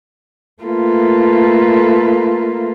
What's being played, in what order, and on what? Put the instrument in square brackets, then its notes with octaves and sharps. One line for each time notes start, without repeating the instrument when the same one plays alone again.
[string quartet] A3 A#3 F4 A4 B4